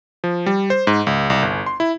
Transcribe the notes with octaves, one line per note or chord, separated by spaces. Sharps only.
F3
G3
C5
G#2
C#2
C2
G1
C6
E4